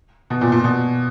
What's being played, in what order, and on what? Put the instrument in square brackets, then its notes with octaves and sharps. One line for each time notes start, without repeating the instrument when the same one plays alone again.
[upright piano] B2
A#2
A#2
B2